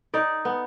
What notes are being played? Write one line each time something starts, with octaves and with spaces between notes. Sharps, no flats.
D#4 D5
B3